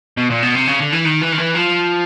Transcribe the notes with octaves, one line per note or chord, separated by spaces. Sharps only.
B2
A#2
B2
C3
C#3
D3
E3
D#3
E3
D#3
E3
F3